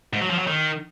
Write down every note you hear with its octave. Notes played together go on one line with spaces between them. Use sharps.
G#2
F#3
F3
F#3
D#3